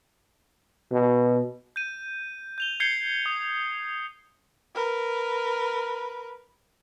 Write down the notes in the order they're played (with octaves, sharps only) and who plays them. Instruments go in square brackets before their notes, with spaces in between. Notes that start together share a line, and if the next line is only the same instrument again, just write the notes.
[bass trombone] B2
[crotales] G6 D#7
G6 F7 G7
G6 G#6 C7 C#7 G7
D#6
[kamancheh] A#4 B4